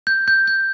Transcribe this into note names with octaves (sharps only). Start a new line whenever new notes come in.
G6
G6
G6